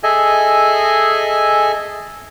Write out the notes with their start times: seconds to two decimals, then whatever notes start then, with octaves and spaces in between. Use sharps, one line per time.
0.03 G#4 A4 D#5 E5 G#5